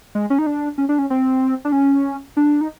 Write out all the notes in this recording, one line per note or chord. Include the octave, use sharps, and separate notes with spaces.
G#3
C#4
D#4
D4
C#4
D4
C#4
C4
D4
C#4
D4
D#4